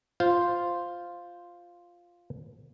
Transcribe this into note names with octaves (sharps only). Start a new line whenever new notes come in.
F4 C5